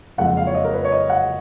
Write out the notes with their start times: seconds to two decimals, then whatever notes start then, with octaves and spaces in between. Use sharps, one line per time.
0.18 F#1 F2 F3 G#3 F#5
0.37 F5
0.47 C#5
0.55 D#5
0.64 A#4
0.74 B4
0.84 C#5
0.92 D#5
1.10 F#5